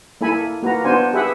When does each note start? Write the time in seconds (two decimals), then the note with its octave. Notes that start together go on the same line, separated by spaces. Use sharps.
0.21 A#3 E4 A4 G#5 B5
0.63 A#3 F#4 B4 A#5
0.84 B3 D4 F#4 C5 G#5
1.13 G4 G#4 B4 E5 F#5